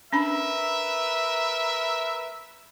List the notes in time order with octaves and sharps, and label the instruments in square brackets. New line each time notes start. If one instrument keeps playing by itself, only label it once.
[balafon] C#4 D4 B5 [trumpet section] A#4 B4 E5